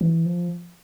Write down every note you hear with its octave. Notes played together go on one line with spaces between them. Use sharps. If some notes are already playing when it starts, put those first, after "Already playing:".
E3
F3